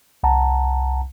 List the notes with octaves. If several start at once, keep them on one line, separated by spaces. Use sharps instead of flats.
C2 F#5 A5 A#5